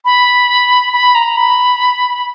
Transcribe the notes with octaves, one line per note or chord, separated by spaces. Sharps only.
B5
B5
A#5
B5